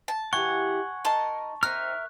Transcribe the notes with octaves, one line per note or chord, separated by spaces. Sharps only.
A5
E3 G4 G#4 F#5 G#5 C#6
D#4 A#4 D#5 A5 C6
C4 D#4 A#4 E5 F6 F#6